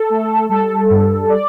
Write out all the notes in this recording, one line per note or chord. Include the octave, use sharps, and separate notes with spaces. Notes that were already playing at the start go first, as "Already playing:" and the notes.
Already playing: A4
A3
G3 A4
G2
D5